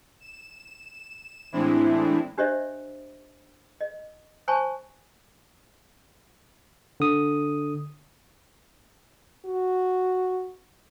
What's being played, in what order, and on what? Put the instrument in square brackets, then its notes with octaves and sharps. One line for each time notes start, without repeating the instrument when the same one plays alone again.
[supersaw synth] E7
A2 E3 G#3 C4 D4 E4
[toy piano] D4 G4 C5 C#5 D#5 E5
D#5
C5 C#5 G#5 A5 B5 C#6
[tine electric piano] D3 D#6
[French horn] F#4